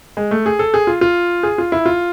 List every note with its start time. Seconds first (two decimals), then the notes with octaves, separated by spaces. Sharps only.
0.17 G#3
0.31 A3
0.46 G#4
0.59 A4
0.74 G#4
0.87 F4
1.01 F4
1.43 G#4
1.58 F4
1.72 E4
1.86 F4